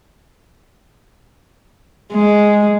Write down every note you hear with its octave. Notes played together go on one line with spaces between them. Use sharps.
G#3